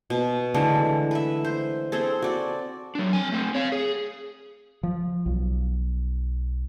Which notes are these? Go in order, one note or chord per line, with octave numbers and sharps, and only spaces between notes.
B2
D3 E3 G#3 A3
B4 E5
C5
C4 G#4 A4
F#4 D5
F#3 D4
C4 G#5
A3 C4
C#5 F5
G#4
F3
B1